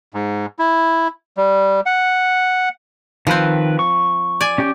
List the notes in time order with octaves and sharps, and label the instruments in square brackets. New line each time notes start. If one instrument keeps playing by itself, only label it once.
[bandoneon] G#2
E4
G3
F#5
[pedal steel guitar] D#3 B4 [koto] F3 C4
[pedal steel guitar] C#6
[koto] D5 G#5
[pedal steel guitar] C#4 G4 G5